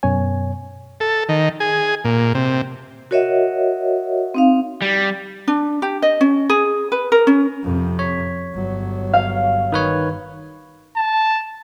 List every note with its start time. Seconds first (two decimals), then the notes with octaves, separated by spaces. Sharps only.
0.03 F#2 B2 C#5 G#5
1.00 A4
1.29 D#3
1.60 G#4
2.05 A#2
2.35 C3
3.11 F#4 A#4 C#5 D#5 E5 F#5
4.34 C4 D#4 F5
4.82 G3
5.48 D4
5.82 G4
6.02 D#5
6.21 C#4
6.50 G#4
6.92 B4
7.12 A#4
7.27 C#4
7.63 F2 C3
7.99 C#5 B6
8.53 G1 F#3
9.13 F5
9.72 D#3 B4 C#5
10.96 A5